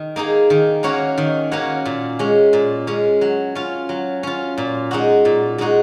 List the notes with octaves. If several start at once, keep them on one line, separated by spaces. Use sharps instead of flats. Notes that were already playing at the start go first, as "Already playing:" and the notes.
Already playing: D#3
A#3 D#4 G#4
D#3
A#3 C#4 F#4 C#5
D#3
A#3 C#4 F#4 C#5
A#2
G#3 C#4
A#2
G#3 C#4
F#3
C#4 F4
F#3
C#4 F4
A#2
G#3 D#4 F#4
A#2
G#3 D#4 F#4